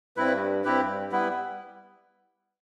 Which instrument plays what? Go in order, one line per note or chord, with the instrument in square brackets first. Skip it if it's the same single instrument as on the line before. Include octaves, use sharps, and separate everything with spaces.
[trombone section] G2 [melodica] C4 E4 B4
[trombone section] G2 [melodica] C4 E4 G4 B4
[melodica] G3 B3 E4 B4